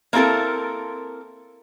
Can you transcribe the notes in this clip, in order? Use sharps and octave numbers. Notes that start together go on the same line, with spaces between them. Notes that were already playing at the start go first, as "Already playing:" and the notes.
A#3 C4 E4 A4 A#4